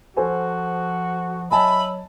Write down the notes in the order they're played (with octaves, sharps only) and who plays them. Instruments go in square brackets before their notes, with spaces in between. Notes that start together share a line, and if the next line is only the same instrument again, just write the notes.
[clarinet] F3 [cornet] F#4 [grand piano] A4 C5 G#5
[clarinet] F#3 [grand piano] D#5 G#5 A5 [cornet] E5 [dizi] B5